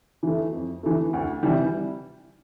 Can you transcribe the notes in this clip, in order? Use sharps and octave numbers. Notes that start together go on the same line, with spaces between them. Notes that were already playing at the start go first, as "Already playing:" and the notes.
E3 A3
F2
E3 A3
D2
C3 E3 G3